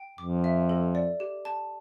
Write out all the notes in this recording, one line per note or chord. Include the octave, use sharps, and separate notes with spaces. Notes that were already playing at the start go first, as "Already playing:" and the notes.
Already playing: G5
F2 D6
E5
A4
D5
G4
A5